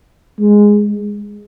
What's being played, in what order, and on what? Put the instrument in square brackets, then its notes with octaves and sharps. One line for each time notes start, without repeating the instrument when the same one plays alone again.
[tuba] G#3